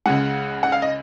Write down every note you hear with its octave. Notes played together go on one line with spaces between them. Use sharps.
C#2 C#3 G#3 F#5
F#5
F5
D#5